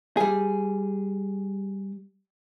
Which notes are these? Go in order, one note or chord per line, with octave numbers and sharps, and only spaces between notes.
G3 G#4